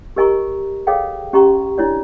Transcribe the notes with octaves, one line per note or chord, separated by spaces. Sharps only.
G4 A#4 D#5 G#5 A#5 C#6
G#4 A4 C#5 D#5 F5 G5
C#4 G4 D#5 A#5 C6 C#6
D4 E4 C#5 D5